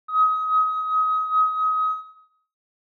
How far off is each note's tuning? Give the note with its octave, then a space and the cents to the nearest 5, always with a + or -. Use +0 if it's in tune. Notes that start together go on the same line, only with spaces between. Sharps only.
D#6 +30